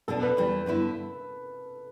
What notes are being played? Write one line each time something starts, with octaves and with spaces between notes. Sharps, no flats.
B2 B3 D4 A4
B4
E2 E3 G3 E4
G2 D3 B3 E4